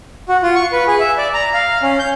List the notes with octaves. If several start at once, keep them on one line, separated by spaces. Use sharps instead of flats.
F#4
F4
C#6
B4
G#4
E5
D5
A#5
F5
C#4
G6